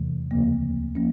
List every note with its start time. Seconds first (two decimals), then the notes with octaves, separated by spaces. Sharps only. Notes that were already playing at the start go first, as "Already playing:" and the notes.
Already playing: E2 C3 E3 A3
0.31 D2 C#3 F3 A#3
0.95 F3 A#3 C#4